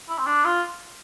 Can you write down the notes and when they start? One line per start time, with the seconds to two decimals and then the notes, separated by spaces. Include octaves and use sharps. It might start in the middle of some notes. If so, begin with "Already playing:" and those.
0.09 E4
0.18 C4
0.26 D4
0.45 F4